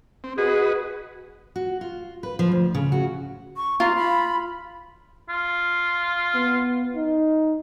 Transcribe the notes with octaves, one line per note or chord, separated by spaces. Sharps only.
C4
F#4 G#4 B4 D#5
F#4
F4
B4
F3
D2
C#3
F#4
C#6
F4 A#5
B5
F4
B3
D#4